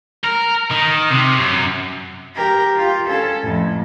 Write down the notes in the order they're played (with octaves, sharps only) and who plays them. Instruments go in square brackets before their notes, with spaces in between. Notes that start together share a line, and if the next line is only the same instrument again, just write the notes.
[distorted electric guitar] A#4
D#3
C3
F#2
[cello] G4 A#4
F4 G4
C#4 A4
F2 A2